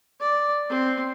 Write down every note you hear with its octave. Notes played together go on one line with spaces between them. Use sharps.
D5
C4